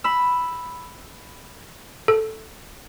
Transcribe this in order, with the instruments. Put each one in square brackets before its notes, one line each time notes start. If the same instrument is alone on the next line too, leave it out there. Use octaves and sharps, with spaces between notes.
[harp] B5 E6
[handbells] A4